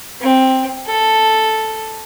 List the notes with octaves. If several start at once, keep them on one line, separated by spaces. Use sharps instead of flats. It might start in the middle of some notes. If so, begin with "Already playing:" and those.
C4
A4